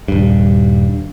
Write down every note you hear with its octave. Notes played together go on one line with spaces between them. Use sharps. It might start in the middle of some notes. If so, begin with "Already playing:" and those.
D#1 G2